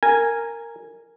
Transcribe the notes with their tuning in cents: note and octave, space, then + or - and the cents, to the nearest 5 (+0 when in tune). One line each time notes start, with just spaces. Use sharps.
A#4 -10 G#5 -5